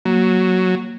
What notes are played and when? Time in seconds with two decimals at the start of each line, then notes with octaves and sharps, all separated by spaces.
0.05 F#3 A#3